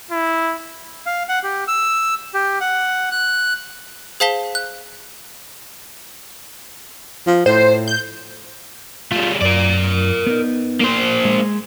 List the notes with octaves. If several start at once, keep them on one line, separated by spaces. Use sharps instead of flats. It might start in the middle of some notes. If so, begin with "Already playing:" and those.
E4
F5
F#5
G4
E6
G4
F#5
F#6
G#4 C5 F5 A5 B6 G7
F#6
F3
A2 C5
G6
G3 A3 F4
F#2 A#4 D5
B3 D#4
A#3 C5
G#3